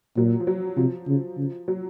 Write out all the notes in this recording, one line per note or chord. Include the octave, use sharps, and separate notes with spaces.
A#2 F#3
F3
F#3
C3 F3
C#3
C#3
F#3